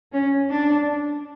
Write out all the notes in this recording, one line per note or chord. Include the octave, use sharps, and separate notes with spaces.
C#4
D4